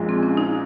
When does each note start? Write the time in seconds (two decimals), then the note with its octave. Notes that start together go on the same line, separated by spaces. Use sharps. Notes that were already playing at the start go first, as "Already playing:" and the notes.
Already playing: A#1 A#2 G#3
0.09 C4
0.23 C#4
0.37 D#4